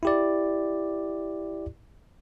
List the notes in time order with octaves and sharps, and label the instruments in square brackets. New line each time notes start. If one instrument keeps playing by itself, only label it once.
[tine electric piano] E4 G4 D5